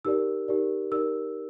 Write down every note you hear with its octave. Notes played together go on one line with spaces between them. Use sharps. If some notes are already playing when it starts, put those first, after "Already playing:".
D#4 G4 A#4 D5 E6
D#4 G4 A#4 D5
D#4 G4 A#4 D5 E6